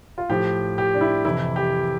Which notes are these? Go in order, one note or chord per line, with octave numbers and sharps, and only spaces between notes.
F4
A2 F3 G4
G4
D4
E4
F2 C3 E3 E4
G4